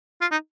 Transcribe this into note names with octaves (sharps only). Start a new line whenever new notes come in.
F4
D#4